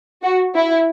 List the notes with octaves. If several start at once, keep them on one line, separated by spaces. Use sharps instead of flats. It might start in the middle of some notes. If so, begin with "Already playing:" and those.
F#4
E4